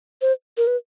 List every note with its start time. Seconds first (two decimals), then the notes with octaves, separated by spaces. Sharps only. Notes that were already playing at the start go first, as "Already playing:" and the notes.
0.22 C5
0.57 A#4
0.67 B4